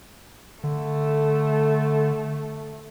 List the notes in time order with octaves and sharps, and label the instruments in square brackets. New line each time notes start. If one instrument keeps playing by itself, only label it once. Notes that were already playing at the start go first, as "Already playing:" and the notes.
[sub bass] D3 [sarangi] A3